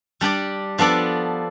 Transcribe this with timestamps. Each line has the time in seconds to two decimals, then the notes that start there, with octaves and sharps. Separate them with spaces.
0.21 G3 D4 G4 D5
0.79 F3 B3 D4 A4 D5